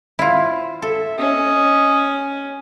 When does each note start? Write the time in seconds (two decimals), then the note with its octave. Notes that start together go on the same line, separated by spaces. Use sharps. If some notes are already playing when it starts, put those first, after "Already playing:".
0.19 E4 F4
0.52 C5
0.82 A4 E5
1.19 C#4 D#5